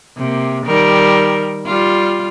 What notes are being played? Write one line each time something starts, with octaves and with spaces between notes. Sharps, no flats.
C3 A#3
D#3 G3 A#4
G3 F4